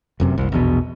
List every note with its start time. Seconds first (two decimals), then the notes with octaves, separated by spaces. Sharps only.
0.20 F1 F#2 C3
0.38 F#1 C2
0.52 A#1 E2 B2